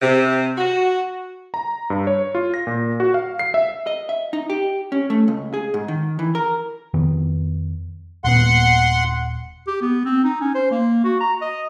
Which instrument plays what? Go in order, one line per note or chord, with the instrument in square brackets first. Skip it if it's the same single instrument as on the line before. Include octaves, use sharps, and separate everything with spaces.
[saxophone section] C3
F#4
[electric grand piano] A#5
G2
C#5
F4
A#6
A#2
F#4
F5
C7
E5
[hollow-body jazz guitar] D#5
E5
D#4
G4
C#4
A3
C#2
G#4
G#2
D#3
E3
A#4
[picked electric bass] F2 D#3 B3
[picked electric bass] D#1 A#2 B3 [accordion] F#5 C6
[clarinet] G4
B3
C4
D#4
C#4
C5
A#3
F#4
A#5
D#5